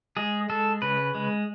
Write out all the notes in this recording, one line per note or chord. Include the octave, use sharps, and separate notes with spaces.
G#3 G#4
G#3 A4
C#3 B4
G#3